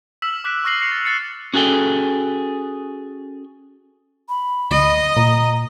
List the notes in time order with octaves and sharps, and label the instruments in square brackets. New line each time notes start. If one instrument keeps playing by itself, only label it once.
[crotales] E6 F6 B6 E7 F#7
D6 F#6 B6 D7 E7
C#6 F6 A#6 C7 F#7
A#6 C7 C#7 F7
A6
F#6 A6 C#7
[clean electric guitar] C#4 F#4 G#4 A4 G5
[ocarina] B5
[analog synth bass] D2 [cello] D#5
[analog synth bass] A#2 [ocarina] A#5